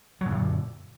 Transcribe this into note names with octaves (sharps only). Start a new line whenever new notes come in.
F#2 A#2 D3 F#3